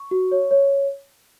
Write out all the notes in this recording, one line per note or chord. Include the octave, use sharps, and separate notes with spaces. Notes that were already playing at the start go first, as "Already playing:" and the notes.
Already playing: C#6
F#4
C#5
C#5